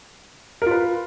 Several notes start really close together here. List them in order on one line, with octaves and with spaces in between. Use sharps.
A#4 F4 B4